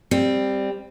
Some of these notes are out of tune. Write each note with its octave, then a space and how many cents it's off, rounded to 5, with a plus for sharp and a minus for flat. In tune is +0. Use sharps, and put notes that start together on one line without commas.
G3 +10 C4 +0